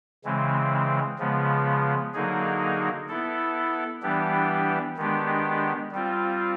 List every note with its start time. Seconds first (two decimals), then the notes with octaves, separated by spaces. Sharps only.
0.24 C#3 E3 G#3 C4
1.19 C#3 F3 G#3 B3
2.14 D3 F#3 A#3 D#4 G#4
3.08 B3 E4 A4
4.03 E3 G3 B3 D4 G4
4.97 D#3 G#3 B3 D4 G4
5.92 G3 C4 F4